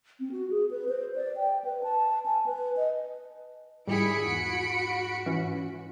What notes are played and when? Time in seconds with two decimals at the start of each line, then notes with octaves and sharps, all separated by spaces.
0.20 C4
0.32 F#4
0.50 G#4
0.71 B4
0.89 C5
1.16 D5
1.36 G5
1.64 B4
1.83 A5
2.26 G#5
2.46 B4
2.77 D#5
3.87 G#2 D#3 G3 E4 G#4 B5 C#7 D7
4.25 E2 F#4
5.26 E3 C#4